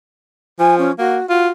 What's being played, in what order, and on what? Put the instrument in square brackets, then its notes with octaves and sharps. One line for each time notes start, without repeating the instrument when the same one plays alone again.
[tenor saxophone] F3 [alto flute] G#5
[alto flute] C#4
[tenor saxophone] A#3 [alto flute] F#4
[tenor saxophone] F4 [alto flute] F#4